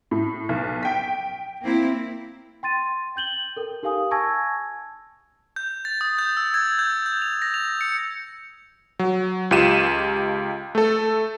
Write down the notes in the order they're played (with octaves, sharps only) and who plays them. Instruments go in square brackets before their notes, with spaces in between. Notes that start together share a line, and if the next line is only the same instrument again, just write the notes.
[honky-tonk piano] A2
B1
G5 B6
[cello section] A#3 C4 E4
[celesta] G5 C6 A6 D#7
G5 G6 F#7 G7
A4 A#4 G5
D#4 G4 A#4 F5 G#5 D#6
G#5 A5 C#6 E6 G#6 A#6
[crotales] G6
A6
D#6
G6
E6
G#6
G6
G6
F7
A#6
F7
C#7
[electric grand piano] F#3
C#2 F4 G4 D#7 E7
A3 A4